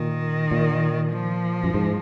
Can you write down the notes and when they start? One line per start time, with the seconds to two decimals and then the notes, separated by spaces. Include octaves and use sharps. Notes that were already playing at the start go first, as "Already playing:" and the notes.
Already playing: A#2 D#3
0.51 A#2
1.13 F3
1.64 F#2
1.74 G#2